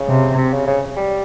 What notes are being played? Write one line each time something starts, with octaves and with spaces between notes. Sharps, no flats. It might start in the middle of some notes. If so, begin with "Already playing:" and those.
Already playing: C#3
C3
C3
C#3
C#3
G3